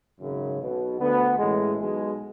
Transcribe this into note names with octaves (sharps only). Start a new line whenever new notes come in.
G#1 F#2 C#3
B1 B2
D2 D3 B3
A1 A2 E3 G#3
B1 B2 G#3